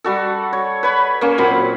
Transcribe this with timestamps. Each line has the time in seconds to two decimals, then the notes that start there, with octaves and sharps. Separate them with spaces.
0.04 G3 F#4 A4
0.53 C#5
0.83 B4 C#5 B5
1.21 A#3 C#4
1.38 A#2 F#3 C4 B5